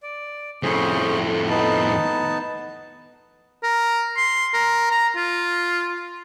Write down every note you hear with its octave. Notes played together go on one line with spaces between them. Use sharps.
D5
F2 A2 C#4 G#4 C5
B3 D#4 A5
A#4
C6
A#4
A#5
F4